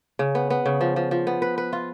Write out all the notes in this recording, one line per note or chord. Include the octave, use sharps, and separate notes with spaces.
C#3
B3
B3
C#3
F3
F3
F3
B3
B4
B4
F4